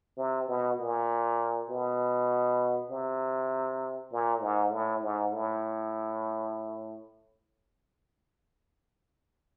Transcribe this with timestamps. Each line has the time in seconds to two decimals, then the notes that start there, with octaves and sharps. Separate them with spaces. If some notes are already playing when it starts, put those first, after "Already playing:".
0.18 C3
0.49 B2
0.79 A#2
1.70 B2
2.90 C3
4.12 A#2
4.41 G#2
4.72 A2
5.03 G#2
5.32 A2